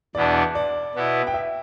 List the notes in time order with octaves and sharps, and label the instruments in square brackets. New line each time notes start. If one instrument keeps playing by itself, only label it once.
[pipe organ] E2 B2 B3 D4 [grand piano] D5
[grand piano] D5
[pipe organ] B2 B3 E4
[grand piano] G5
E5